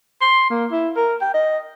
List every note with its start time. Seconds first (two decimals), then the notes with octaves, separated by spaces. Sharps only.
0.21 C6
0.50 A#3
0.72 E4
0.96 A#4
1.21 G5
1.34 D#5